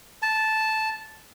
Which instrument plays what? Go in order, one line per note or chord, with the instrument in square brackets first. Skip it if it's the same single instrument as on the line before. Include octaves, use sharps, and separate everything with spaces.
[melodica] A5